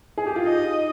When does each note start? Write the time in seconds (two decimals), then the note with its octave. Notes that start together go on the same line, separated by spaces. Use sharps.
0.18 G#4
0.26 G4
0.36 F4
0.44 D#4 D#5